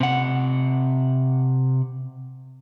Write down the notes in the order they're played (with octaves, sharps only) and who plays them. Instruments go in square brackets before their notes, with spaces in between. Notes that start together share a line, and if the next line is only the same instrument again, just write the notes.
[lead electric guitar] C3 F#5